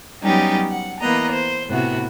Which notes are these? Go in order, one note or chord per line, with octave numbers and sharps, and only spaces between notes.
F#3 G3 B3 C#4 D#4 G4
F#5
E3 A#3 B3 D#5 A#5
C5
A2 C3 B3 E4 F#4